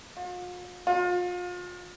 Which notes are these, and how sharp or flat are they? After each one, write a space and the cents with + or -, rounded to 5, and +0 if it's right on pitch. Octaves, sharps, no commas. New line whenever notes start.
F4 +45
F4 +35